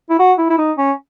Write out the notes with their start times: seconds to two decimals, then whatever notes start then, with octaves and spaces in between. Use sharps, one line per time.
0.10 E4
0.19 F#4
0.38 E4
0.50 E4
0.58 D#4
0.78 C#4